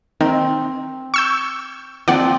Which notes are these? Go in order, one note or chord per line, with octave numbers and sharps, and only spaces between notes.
D#3 C4
C#6 E6 G6
F3 C4 F4 D5 F#5